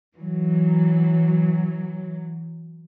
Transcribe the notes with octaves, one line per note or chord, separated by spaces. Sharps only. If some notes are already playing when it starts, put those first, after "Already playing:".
E3 F#3